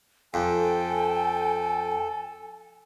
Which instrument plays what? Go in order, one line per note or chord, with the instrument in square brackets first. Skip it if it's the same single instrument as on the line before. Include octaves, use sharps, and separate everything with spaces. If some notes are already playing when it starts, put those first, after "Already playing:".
[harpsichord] F2 [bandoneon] A4 [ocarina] G5 [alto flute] G#5